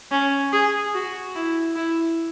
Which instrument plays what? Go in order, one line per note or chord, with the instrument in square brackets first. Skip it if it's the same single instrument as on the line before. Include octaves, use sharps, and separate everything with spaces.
[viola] C#4
G#4
F#4
E4
E4